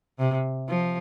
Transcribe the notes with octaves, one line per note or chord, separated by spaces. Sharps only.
C3
F3